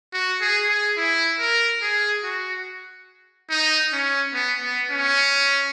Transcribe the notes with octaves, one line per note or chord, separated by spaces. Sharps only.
F#4
G#4
G#4
E4
A#4
G#4
F#4
D#4
C#4
B3
B3
C#4